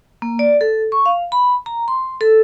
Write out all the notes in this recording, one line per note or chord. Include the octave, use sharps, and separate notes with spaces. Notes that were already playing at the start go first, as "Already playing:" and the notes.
A#3
D5
A4
C#6
F5
B5
A#5
C6
A4